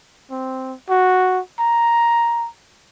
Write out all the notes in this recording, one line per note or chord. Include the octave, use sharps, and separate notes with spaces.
C4
F#4
A#5